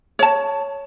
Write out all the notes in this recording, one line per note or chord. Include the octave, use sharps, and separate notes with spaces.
C#5 A5